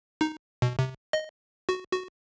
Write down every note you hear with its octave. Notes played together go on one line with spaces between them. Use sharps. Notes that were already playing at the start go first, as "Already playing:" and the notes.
D#4
B2
C3
D#5
F#4
F#4